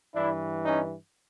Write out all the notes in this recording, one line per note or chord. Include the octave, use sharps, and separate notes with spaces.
G2 E3 D4 E4
C#4 D#4